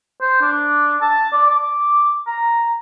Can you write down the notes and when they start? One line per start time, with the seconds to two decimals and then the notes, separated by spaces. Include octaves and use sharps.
0.21 C5
0.42 D4
1.01 A5
1.32 D5
1.47 D6
2.27 A#5